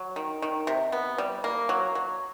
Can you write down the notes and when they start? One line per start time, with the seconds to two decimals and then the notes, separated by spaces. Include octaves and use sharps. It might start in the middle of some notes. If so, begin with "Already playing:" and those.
Already playing: F#3
0.16 D#3
0.42 D#3
0.67 C3
0.92 B3
1.18 G3
1.44 A#3
1.69 F#3
1.95 F#3